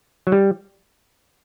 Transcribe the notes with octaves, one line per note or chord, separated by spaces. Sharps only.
F#3
G3